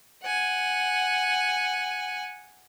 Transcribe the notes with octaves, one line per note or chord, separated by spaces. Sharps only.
F#5 G#5